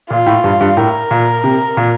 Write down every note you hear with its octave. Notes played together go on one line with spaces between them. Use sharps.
A#2 F4
A2
G2
G2
A2 A#4
A#2
C3
A#2